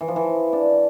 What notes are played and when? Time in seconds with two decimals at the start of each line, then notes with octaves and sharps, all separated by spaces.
0.01 E3
0.08 F3
0.16 E3
0.53 D4